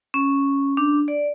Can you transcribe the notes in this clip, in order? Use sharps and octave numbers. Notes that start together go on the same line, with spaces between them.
C#4
D4
D5